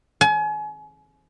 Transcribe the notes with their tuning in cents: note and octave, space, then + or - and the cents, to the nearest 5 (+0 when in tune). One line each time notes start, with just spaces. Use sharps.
G#5 +35